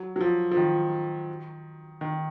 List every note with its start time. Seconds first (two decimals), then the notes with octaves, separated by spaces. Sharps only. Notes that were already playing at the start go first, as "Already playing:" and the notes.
Already playing: F#3
0.16 F#3
0.21 F3
0.51 F3
0.57 D#3
2.01 D#3